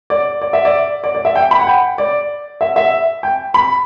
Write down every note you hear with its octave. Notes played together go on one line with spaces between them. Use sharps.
D5
D5
E5
D5
D5
D5
E5
G5
B5
F#5
G5
D5
E5
E5
G5
B5